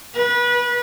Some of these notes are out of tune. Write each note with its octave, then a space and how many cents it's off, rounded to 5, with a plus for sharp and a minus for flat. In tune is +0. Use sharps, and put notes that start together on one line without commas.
B4 -30